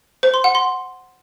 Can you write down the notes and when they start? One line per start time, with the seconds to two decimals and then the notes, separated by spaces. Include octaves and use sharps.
0.23 C5
0.34 C6
0.44 F#5
0.55 C6